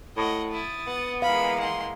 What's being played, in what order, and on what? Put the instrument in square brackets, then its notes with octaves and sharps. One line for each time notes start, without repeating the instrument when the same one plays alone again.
[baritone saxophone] A2 [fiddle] D#5 F#5
[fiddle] E4 [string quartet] D#6 A6
[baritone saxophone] B3 [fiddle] F#5
[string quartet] E3 G#3 A#3 [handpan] F5 [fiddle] B5
[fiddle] F#5 C6